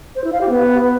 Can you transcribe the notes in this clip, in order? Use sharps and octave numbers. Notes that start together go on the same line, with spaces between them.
C5
E4
F5
G4
B3